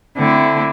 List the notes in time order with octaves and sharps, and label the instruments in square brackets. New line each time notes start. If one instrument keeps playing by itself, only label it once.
[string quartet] D3 A3 C4 E4